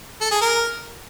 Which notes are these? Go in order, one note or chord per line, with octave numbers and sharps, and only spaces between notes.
A4
G#4
A#4